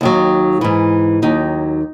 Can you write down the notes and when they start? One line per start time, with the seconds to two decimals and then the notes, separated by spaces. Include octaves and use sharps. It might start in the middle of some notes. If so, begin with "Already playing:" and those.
0.01 D#2 D#3 F#3
0.61 G#2 E3
1.22 D#2 D#3 F#3 D#4